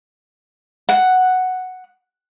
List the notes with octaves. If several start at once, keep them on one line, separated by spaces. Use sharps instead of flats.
F#5